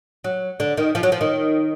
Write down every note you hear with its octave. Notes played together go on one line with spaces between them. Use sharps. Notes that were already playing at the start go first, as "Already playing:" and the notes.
F#3
D3
D#3
F3
F#3
F3
D#3